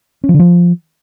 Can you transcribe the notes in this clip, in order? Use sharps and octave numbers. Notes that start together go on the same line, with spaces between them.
C#4
F3
D3
F3